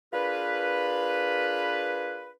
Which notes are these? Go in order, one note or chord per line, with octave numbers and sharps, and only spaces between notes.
D4 F4 G#4 A#4 B4